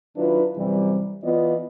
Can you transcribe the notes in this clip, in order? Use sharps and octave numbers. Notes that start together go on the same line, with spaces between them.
D#3 F#3 D4 E4 F4 B4
F#2 C3 E3 G3
E3 B3 F4 D5 D#5